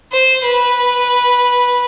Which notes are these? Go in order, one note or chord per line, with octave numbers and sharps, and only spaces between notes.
C5
B4